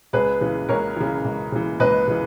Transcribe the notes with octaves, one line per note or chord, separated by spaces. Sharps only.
C#2 G#4 B4
C#3 E3
C#2 A#4 C#5
C#3 E3
C#2
C#3 E3
C#2 B4 D#5
C#3 E3